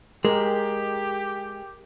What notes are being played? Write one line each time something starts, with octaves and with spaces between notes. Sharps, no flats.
G#3 G4 A#4